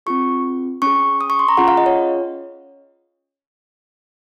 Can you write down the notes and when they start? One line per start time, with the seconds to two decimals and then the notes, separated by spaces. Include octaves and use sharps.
0.06 C4 F4 G#4 C#6
0.82 C#4 G#4 C#6
1.21 D#6
1.30 C#6
1.39 C6
1.48 A#5
1.57 C#4 F4 G#4 F#5
1.68 F5
1.77 D#5
1.86 C#5